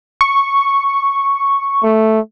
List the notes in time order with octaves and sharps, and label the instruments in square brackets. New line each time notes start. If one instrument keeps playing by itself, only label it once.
[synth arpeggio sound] C#6
[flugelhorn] A3